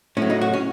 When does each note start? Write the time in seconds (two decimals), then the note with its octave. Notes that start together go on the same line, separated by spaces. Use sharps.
0.17 A2 C#4
0.22 F#3
0.30 D#4
0.41 F#4
0.53 C#4